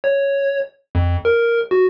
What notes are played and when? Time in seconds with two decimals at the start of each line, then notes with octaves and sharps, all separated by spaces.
0.04 C#5
0.95 F2
1.25 A#4
1.71 F#4